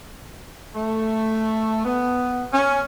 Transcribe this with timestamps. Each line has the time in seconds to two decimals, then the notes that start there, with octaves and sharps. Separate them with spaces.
0.75 A3
1.85 B3
2.53 C#4